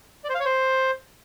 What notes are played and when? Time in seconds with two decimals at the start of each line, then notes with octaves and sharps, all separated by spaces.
0.24 D5
0.29 C5
0.35 F5
0.40 C#5
0.45 C5